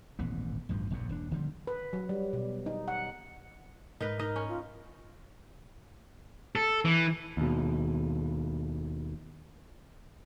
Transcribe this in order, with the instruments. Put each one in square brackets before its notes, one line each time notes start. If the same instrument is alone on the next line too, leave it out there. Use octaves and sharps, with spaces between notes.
[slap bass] D#1 A1 G#2 B3
A1 D2 G2 F3
F1 A#1 F2 A#2
D#1 D4
D#1 D3 F3 G3
[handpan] B4
F#3
G3
B2
D#4
F#5
[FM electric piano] G#2 [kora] D#4 A#4 B4
[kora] D#4 D#5 [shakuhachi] A#4
[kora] C#4
[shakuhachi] F4
[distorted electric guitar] A4
E3
[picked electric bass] D#2 B2